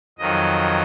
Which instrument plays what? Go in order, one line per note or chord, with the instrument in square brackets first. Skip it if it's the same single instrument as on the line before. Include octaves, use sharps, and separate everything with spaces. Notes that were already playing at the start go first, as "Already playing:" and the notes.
[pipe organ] F2 D#3 F#3 D#5